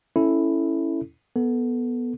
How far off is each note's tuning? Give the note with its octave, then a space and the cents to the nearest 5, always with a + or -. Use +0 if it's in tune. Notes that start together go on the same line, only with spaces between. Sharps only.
C#4 +0 E4 +0 A4 +0
B3 -10 A4 +0